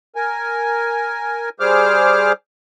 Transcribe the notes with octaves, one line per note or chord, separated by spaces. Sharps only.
A#4 G#5
G3 G#4 C5 D6 F6